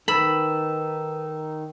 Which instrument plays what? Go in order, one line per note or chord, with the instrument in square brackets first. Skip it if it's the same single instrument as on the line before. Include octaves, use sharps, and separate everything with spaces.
[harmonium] D#3 D#4 [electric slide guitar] A4 B4 [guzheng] B5 [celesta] E6 E7 F#7